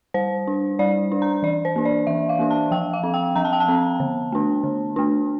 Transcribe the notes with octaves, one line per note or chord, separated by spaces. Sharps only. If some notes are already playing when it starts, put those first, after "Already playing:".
G3 C5
D4
G3 D5
D4
A#5
E3 D5
C5
A#3 D4
D5
E3 E5
F5
A#3 D4
A5
F3 G5
F5
C4
G5
F3 A#5
A5
G5
A5
C4
D3
A3 D4
D3
A3 D4